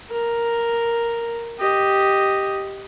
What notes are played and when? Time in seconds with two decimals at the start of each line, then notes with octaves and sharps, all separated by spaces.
0.10 A#4
1.59 G4 D#5